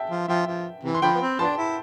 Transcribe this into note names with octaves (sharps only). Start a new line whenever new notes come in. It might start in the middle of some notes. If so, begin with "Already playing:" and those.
Already playing: E5 G5 A5
F3
F3 E5 G5
F3
C3 E3
C6
D3 F3 G5 B5
B3
C4
F3 B3 D4 A5 C6
E4